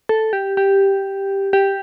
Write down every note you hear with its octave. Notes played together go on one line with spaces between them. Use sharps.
A4
G4
G4
G4